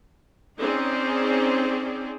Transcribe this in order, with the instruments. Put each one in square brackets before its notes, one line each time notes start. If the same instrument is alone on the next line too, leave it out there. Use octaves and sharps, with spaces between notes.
[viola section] C4 C#4 D#4 G#4 D5